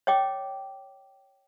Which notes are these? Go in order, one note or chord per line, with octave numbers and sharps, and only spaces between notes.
C#5 D#5 G5 D6